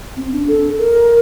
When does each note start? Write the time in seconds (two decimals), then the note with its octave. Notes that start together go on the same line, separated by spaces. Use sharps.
0.17 C4
0.32 D4
0.48 A4
0.79 A#4